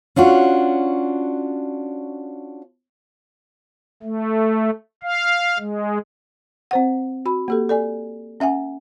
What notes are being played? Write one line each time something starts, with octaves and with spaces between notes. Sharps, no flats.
C#4 D4 F4 F#4
A3
F5
G#3
C4 C5 F#5
F#4 B5
A#3 G4 A4
A4 D5 G#5
C#4 E5 F#5 G#5